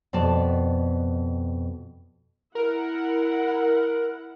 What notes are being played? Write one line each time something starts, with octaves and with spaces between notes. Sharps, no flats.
F2 B2 D5 A5
E4 A#4 F#5